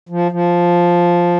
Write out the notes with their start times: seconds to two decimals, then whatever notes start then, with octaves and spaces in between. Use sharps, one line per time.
0.09 F3
0.32 F3